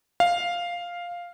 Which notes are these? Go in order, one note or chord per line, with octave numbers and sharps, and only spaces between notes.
F5